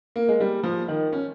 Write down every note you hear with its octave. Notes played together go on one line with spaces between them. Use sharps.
A#3
G#3
G3
F3
D#3
C#4